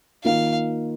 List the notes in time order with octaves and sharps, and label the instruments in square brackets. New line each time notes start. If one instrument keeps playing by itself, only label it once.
[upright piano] D#3 A#3 F4 [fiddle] F5